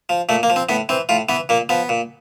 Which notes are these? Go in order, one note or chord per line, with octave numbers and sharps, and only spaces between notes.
F3
A#2 A3
A#3
F3
C4
A2 B3
E3 C4
A2 F4
E3 B3
A#2 A#3
F3 B3
A#2